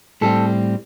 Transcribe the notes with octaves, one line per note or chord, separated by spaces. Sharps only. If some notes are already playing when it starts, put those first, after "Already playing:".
A2 G3 C4 A4